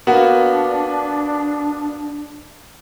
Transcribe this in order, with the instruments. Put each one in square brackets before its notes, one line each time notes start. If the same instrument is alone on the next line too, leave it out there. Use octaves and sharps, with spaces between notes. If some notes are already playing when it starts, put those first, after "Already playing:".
[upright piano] A#3 B3 F#4 [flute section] D4